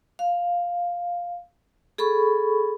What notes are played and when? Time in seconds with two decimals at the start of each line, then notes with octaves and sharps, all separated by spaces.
0.19 F5
1.98 G#4 A4 B5 C#6